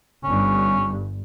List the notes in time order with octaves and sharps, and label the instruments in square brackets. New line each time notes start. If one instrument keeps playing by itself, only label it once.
[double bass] G1 G2 [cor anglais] C#4